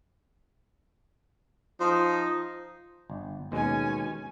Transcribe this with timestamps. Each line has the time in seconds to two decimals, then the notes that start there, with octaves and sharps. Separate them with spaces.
1.80 F3 D#4
3.10 G1
3.52 D#2 B2 G#3 C#4 G#5